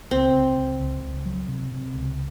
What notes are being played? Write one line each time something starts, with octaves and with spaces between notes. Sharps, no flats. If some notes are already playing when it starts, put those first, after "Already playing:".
C#2 C4
C#2
C#2
C#2
C#2
F#3
C3
C3
C#2